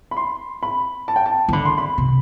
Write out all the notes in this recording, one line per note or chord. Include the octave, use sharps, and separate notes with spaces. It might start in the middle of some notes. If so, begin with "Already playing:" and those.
B5
C6
B5
A5
G5
A5
E3
D3 B5
C6
B5
C3